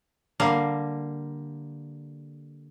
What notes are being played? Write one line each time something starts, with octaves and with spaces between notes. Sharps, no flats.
D3 G3 A#3 F5